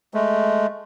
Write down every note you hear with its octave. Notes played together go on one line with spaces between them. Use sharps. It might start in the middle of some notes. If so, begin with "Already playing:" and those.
G#3 A3